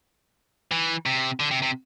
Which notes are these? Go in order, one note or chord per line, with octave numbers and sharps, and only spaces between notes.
E3
C3
D3
C3
C3